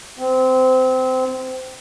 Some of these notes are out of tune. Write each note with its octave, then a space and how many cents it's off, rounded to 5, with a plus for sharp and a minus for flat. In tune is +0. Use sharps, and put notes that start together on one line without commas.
C4 -20